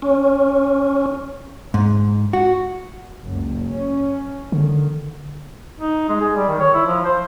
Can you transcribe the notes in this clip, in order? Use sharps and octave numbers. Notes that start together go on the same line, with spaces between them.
C#4
G#2
F#4
F#1 C#2
C#4
D3 D#3
D#4
G#3
G#4
G3
D#3
C#5
E4
F3
C5